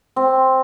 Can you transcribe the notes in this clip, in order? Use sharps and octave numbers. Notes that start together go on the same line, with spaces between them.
C4